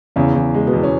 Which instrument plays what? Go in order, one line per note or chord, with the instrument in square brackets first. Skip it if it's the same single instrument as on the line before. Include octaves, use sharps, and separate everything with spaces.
[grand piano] E2 [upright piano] C#3 C#4
[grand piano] E2
G#3
[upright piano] B2 B3
[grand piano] E2
[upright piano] C#4